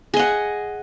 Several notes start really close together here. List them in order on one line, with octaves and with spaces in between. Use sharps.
G#4 D#5 F#5